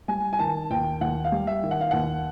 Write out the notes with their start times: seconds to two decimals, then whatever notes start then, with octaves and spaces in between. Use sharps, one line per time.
0.08 G3 G#5
0.33 G#5
0.39 D#3 A5
0.71 D#2 G5
1.01 D#2 F#5
1.24 F5
1.32 G3
1.47 E5
1.63 D#3
1.71 F#5
1.81 F5
1.91 D#2 F#5